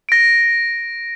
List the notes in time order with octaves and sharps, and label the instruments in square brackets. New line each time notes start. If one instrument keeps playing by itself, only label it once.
[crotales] A#6 D7